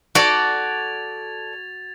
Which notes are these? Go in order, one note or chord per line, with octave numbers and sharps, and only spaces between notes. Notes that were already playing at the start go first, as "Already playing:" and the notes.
F#4 A4 D5 G#6 A6 F7